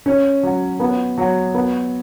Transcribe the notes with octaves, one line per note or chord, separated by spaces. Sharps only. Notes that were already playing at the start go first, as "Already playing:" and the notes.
C#4
F#3
B3
F#3
B3